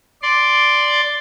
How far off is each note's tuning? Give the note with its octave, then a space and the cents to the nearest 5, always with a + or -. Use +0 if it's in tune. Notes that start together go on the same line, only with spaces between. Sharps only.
D5 +0 C6 +0